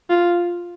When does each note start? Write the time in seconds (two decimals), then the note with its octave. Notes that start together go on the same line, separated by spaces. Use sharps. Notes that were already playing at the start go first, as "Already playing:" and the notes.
0.10 F4